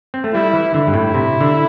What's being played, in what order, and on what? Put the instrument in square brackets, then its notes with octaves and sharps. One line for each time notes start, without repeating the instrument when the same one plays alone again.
[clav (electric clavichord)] C4
A3
[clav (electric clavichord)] G3 [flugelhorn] E4
[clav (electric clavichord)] E3
[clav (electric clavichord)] D3 [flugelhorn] E4
[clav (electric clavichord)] G2
A2
C3
D3